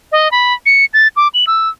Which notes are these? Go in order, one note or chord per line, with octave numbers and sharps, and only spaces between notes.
D#5
B5
C#7
A6
D6
F#7
E6